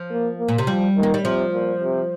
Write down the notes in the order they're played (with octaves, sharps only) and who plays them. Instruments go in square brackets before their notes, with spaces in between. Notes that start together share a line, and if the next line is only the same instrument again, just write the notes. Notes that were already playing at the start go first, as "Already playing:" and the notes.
Already playing: [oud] F3
[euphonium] A#3
A#3
[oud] A#2
C3
[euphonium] F3 [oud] G3
[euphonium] D#3
[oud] A#3
G3
[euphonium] C3 [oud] F3
[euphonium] A#2
C3